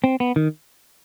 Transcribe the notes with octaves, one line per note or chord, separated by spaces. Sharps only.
C4
B3
D#3